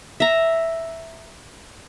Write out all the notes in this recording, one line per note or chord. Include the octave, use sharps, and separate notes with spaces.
E5 A#5